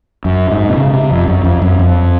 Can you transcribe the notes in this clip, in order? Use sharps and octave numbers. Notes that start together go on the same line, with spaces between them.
F#2
G#2
C3
C#3
C3
F2
F#2
F2
F#2
F2